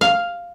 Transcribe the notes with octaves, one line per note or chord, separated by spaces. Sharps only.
F5